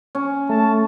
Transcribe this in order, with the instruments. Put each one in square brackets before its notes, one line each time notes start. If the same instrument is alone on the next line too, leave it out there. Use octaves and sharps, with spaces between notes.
[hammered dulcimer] C#4
[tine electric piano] A3 [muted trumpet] A5